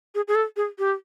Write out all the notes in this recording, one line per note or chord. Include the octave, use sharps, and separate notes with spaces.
G#4
G#4
A4
G#4
G4